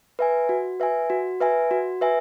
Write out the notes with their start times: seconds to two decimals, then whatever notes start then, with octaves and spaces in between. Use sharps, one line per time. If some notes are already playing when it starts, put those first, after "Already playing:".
0.19 B4 E5 G#5
0.49 F#4
0.80 B4 E5 G#5
1.10 F#4
1.41 B4 E5 G#5
1.71 F#4
2.01 B4 E5 G#5